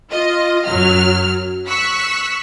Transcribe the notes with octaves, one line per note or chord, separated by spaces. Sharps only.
F4 D#5
F#2 F#3 F6
C#6 E6 F#6 B6